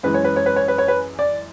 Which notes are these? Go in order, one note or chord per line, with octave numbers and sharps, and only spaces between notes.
F#2 E3 G#3 B4
C#5
B4
C#5
B4
C#5
B4
C#5
B4
D5